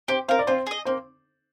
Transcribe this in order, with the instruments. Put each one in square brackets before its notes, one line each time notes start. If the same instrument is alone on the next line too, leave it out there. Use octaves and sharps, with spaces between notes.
[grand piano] C4 C5 [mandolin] G4
[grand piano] C4 C5 [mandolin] A#4 F5
[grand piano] D5
[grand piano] C4 C5 [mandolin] F4
[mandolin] G#4 D#5
[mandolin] A#3 [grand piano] C4 C5